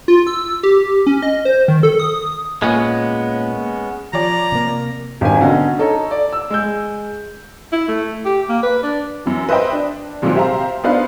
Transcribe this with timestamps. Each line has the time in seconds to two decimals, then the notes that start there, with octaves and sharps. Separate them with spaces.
0.08 F4
0.27 E6
0.63 G4
1.07 C#4
1.22 D#5
1.45 C5
1.68 D#3
1.83 A4
2.00 D#6
2.62 A#2 G#3 B3 C#4
4.13 F3 C#5 D5 A#5
4.52 C3 A#3
5.21 G#1 G2 D#3 G#5
5.40 B2 D3 C#4 D#4 F#4
5.78 D#4 A4 C#5 A#5
6.11 D5
6.33 E6
6.50 G#3 E6 G6
7.73 E4
7.88 A3
8.26 G4
8.49 A#3
8.63 B4
8.83 D4
9.25 F#2 E3
9.49 B4 C5 D#5 E5 G5
9.73 D4
10.22 C2 A#2 D#3 F#3 G#3 C4
10.35 G4 C5 E5 F5 A#5
10.84 B3 D4 D#4 B4 C5 F5